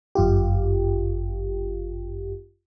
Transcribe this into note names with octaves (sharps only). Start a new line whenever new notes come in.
G1 F#2 F4 G4